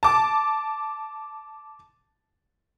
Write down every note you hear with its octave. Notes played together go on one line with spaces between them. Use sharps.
A5 D6